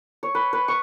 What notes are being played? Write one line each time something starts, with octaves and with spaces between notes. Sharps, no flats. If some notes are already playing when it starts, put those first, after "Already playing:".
C#5
B4
B4
C#6